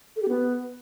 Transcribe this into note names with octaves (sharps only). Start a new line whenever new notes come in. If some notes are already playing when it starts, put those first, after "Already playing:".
A4
G4
B3